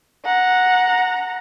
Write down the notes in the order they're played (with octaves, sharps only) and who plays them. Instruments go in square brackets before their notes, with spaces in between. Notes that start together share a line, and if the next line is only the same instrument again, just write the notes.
[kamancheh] F#5 A#5